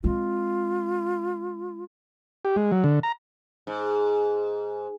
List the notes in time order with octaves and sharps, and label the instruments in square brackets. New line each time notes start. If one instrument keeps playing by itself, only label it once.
[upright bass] G#3 C4 [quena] F4
[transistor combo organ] G4
G#3
F#3
D3
A#5
[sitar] G#2